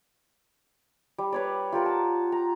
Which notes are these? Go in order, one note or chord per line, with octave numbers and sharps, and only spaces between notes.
G3
B4 C#5 D5
F4 G4 A#4 F#5
A5
A#5